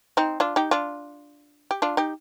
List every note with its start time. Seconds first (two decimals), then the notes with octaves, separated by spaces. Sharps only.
0.17 C4 D#4
0.40 D4 F4
0.56 D#4 G4
0.71 D4 F4
1.71 G4
1.82 D4 F4
1.97 D#4 G4